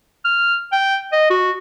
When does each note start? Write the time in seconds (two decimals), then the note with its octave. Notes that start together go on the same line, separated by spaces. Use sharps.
0.25 F6
0.72 G5
1.12 D#5
1.30 F#4